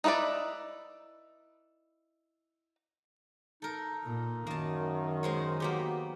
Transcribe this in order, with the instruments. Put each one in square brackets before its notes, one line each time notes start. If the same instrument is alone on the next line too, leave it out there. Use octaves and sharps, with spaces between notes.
[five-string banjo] D#4 E4 G#4 B4 D5
[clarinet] D#4 [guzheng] A4 A#4
[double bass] A#2
[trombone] F#2 [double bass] D#3 [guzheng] A#3 A5
[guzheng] G#3 C5 C#5
[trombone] F#3 [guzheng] A#3 B3 G4